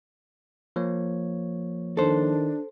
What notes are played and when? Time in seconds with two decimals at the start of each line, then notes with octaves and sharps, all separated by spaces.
0.76 F3 A#3 C#5
1.97 D#3 D4 A4 C5